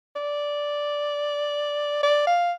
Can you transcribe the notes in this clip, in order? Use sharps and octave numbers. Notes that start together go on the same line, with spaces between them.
D5
D5
F5